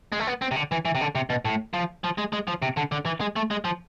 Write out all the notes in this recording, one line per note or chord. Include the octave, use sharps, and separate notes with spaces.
G#3
A3
B3
C4
C3
D3
E3
E3
C3
D3
C3
B2
A2
F3
F3
G#3
G#3
F3
C3
D3
D3
E3
G#3
A3
G#3
F3